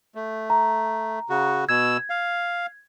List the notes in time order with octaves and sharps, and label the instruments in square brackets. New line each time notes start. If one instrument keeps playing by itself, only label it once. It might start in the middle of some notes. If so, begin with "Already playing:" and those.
[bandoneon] A3
[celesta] A#5
[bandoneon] C#3 F#4
[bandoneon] B2 E6 [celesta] G#6
[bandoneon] F5